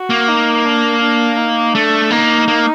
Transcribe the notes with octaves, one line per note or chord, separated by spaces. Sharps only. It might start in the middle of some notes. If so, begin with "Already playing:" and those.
Already playing: F#4
A#3
D#4
D4
D4
D#4
A3 D4
A#3 D#4
A#3